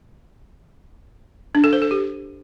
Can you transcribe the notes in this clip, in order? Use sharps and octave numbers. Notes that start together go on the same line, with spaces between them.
D4
A4
C5
A4
G4